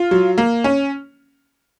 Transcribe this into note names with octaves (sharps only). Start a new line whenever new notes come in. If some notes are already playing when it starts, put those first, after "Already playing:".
Already playing: F4
F#3
A#3
C#4